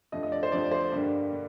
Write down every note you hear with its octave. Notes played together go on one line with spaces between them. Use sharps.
F2 D3 F3 A3 D#5
D#5
D5
C5
F2 D3 F3 A3 D5
C5
G2 D3 G3 A#3
D3